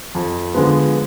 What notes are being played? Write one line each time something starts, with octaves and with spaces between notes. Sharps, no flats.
F2
D3 F3 G#3 B3